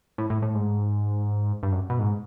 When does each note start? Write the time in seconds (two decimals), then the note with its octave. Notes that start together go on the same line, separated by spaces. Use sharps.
0.18 A2
0.30 A2
0.42 A2
0.55 G#2
1.63 G2
1.72 F#2
1.90 B2
1.99 G#2